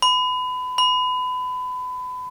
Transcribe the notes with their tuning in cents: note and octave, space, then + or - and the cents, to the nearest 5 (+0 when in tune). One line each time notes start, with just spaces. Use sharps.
B5 +30
B5 +30